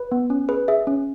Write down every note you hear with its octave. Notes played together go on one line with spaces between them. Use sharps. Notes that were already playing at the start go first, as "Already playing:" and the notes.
Already playing: B4
B3
C#4
G#4 B4
G#4 E5
C#4